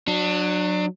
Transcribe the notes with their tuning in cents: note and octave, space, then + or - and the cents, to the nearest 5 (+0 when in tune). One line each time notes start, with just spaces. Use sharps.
F#3 -15 D4 +25